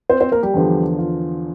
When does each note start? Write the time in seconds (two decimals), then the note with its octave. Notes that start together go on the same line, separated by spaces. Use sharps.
0.09 C4 C5
0.20 C4 C5
0.32 A#3 A#4
0.43 G3 G4
0.54 E2 D3 F3
0.98 F4